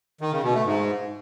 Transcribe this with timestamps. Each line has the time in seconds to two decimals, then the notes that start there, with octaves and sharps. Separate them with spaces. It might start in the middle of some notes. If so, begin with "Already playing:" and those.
0.21 D#3
0.32 C#3
0.43 B2
0.54 A3
0.66 G#2